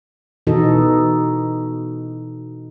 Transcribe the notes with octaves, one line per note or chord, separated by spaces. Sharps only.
B2 E3 D#4 F#4 A4 D#5